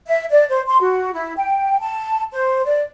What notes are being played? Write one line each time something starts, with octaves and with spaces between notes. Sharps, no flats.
E5
D5
C5
C6
F#4
E4
G5
A5
C5
D5